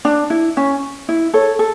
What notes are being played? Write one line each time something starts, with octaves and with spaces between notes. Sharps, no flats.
D4
E4
C#4
E4
A4 C#5
A4